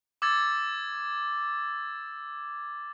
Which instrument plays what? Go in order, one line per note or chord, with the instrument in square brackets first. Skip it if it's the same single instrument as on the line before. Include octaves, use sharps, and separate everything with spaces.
[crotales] D6 E6 G#6 A6